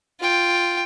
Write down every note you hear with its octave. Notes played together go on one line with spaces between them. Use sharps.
F4 G5